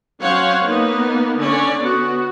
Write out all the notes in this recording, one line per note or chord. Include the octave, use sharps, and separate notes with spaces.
F#3 C#4 C5 C#5 F5 F#5
A#3 B3 D#4
D3 C#4 C#5 D5
B3 F#4